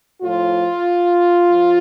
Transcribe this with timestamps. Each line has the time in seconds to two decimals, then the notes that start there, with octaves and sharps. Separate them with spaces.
0.22 A2 F3 F4
1.49 F3